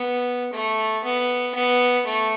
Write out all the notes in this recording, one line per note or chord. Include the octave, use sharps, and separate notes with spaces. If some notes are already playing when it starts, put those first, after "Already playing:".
Already playing: B3
A3
B3
B3
A3